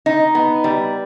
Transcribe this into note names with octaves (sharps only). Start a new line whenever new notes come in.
D#4
B3
G3